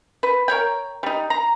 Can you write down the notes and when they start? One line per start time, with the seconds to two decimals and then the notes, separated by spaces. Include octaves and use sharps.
0.23 B4
0.48 A#4 C#5 G5
1.03 G3 D#4
1.30 A#5